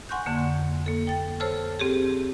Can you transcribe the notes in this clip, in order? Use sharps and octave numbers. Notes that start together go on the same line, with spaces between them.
F#5 G#5 C6 C#6 F#6 G6
F2 D3 A#3
A#3 A4
G5 A6
A4 C5 C#5 A5 E6 F6
C4 G4 G#4